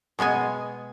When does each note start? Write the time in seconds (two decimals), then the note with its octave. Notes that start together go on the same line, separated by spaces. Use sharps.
0.19 B2 G#3 B3 G#5